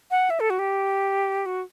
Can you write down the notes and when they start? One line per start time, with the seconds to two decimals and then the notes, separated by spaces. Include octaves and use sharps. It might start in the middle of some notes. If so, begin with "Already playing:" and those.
0.11 F#5
0.30 E5
0.40 A4
0.50 F#4
0.59 G4
1.46 F#4